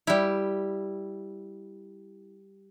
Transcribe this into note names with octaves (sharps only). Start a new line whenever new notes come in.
G3 E4